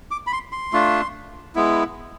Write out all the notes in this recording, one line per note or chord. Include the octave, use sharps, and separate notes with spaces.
D6
B5
C6
C6
A3 D4 F4
G#3 B3 E4